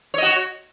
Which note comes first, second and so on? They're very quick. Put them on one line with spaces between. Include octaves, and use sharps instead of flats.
C#5 D#5 F#4